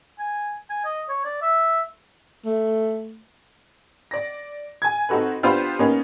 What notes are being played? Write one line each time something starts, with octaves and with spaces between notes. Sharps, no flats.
G#5
G#5
D#5
C#5
D5
E5
A3
D5 A#6
G#5 G#6
C4 D#4 F#4 A4 B4
B3 D4 F4 G4 B4 C5
A#3 B3 C#4 D#4